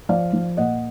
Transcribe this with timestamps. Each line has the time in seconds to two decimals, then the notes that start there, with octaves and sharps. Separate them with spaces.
0.09 F3 D5 F5
0.33 F3
0.57 A#2 D#5 F#5